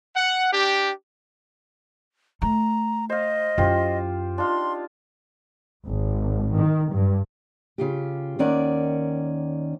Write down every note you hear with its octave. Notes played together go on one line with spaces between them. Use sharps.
F#5
D4 G4
A3 A#5
C5 D#5 F5
F#2 E4 F4 G4 C5
D4 D#4 F4 C6
G#1
D#3
G2
C#3 F4 G4
D#2 D#3 C#4 D5 F#5